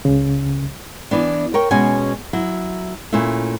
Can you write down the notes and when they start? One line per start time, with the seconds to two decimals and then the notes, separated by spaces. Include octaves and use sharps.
0.05 C#2 C#3
1.11 E3 B3 D4
1.54 A#4 C#5 G5
1.71 B2 G#3 C#4 G#5
2.33 F#3 E4
3.13 A#2 A3 C#4 E4